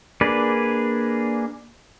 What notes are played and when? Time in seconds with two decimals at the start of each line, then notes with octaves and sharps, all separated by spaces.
0.21 A#3 D4 G#4 B4 D5